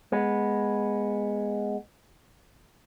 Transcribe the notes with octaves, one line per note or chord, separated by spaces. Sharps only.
G#3 B3